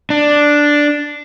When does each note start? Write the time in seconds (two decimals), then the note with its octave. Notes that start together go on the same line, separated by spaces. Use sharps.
0.10 D4